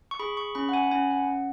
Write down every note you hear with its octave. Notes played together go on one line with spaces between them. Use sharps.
C#6
G#4 B5
C#6
C#4 B5
F#5
G#5
B5
C#4 G#5
F#5
C#4